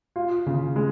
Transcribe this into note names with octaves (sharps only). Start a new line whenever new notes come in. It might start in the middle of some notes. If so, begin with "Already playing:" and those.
F4
C#3
G#3